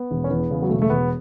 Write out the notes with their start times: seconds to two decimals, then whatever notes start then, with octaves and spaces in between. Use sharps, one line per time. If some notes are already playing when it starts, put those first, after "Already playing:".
Already playing: B3
0.11 E1
0.24 C#4
0.30 E2 B3
0.51 C#3
0.62 F#3
0.70 E1 A3
0.82 A3
0.90 E1 B3